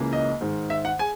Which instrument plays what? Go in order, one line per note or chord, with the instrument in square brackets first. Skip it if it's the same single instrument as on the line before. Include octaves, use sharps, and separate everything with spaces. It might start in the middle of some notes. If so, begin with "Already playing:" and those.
Already playing: [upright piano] C#2 C#3 E3 A#3
[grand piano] D#5
[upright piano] G#2 D#3 G#3
[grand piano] E5
F#5
[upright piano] G#4 [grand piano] G#5